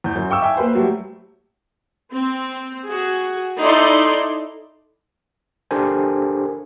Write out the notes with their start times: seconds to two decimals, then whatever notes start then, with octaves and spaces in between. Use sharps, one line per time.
0.04 E2 G6
0.16 F#2
0.30 F5 G5 C#6 D6 E6
0.42 E5 F5 G5 G#5
0.57 A#3 B4 C5
0.75 F#3 G3 A3 G4
2.13 C4
2.88 F#4 G#4
3.60 D#4 E4 A4 D5 C6
5.71 D4 G4 A4 A#4 C5 G#5